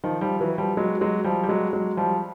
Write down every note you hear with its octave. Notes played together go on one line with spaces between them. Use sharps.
D#3 F3
F3 G3
E3 F#3
F3 G3
F#3 G#3
F#3 G#3
F3 G3
G3
F#3 G#3
F#3 G#3
F3 G3